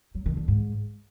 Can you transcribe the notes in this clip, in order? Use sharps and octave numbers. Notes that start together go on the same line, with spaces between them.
F#3
D#3
D3
G#2